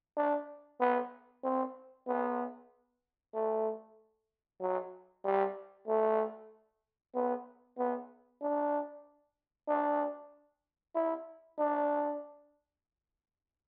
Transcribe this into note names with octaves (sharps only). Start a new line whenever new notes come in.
D4
B3
C4
B3
A3
F#3
G3
A3
B3
B3
D4
D4
E4
D4